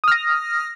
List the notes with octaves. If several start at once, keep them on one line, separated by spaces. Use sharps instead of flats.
D#6 F6 A#6